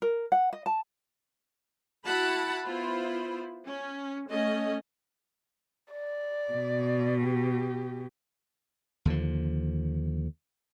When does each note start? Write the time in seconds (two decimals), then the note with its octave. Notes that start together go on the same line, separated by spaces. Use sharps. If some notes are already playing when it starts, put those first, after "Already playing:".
0.02 A#4
0.32 F#5
0.53 D#5
0.66 A5
2.06 E4 F#4 F#5 A5 B5
2.64 B3 E4 F4 C5 B5
3.66 C#4
4.29 A3 C#4 D#5
5.92 D5
6.53 B2
7.22 G4
9.05 D#2 D3 F3